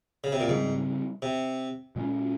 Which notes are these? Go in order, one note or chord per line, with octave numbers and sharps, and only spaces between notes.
C#3
C3
A#2
G#2 C#3 G3 C4
C3
A#2 G#3 C#4